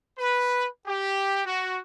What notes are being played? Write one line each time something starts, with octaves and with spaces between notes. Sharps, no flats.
B4
G4
F#4